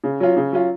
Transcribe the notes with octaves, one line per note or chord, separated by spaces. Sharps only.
C#3
F#3 C#4 F4
C#3
F#3 C#4 F4